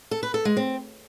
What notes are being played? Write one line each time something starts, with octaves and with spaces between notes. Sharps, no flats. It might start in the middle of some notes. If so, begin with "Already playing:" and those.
A4
B4
A4
G#3
C4